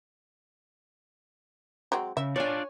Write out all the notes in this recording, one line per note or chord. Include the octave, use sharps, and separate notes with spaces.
F#3 G#3 C4
C#3 E5
D4 F4 C#5 D5 G#5